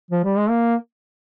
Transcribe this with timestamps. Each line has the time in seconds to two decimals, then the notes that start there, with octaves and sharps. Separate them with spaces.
0.11 F3
0.24 G3
0.38 G#3
0.49 A#3